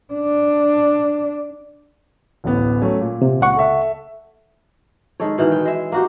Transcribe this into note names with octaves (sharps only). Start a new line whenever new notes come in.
D4
D1 A1 B3
F#3 A3 C#4
A#2
C3
C#2 F#5 C#6
A4 E5
D#3 G#3 A4 C#5
B2 D#3 E3
A3 G5
G#3 E5
A#3 F#4 G4